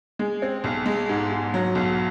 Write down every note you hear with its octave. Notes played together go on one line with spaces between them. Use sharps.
G#3
C4
B1
G#3
G#2
G#2
F#3
B1